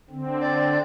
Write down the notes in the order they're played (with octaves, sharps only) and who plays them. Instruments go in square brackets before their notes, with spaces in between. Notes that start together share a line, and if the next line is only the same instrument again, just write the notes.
[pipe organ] D3 C4
[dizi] D5